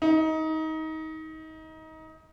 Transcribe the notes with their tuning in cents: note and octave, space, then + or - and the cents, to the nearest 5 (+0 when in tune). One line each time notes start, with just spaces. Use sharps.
D#4 +25